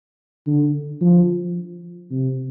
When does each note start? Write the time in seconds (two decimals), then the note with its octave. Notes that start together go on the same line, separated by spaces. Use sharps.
0.47 D3
1.01 F3
2.11 C3